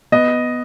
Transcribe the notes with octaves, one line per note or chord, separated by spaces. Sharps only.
B3 D#5